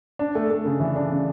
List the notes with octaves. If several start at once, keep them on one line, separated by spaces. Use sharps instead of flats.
D4
A3
A3
C#3
E3
D4
C#3